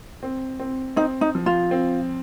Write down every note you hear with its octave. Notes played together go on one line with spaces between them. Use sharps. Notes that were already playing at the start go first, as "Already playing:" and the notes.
C4
C4
C4 D#4
D#4
F3
F4
C4